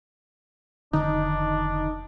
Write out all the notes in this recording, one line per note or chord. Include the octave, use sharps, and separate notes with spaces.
F1 D3 D#3 D4 D#4